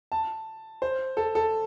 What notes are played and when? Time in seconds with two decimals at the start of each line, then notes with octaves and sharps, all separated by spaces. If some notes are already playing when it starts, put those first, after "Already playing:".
0.12 A5
0.82 C5
1.17 A4
1.35 A4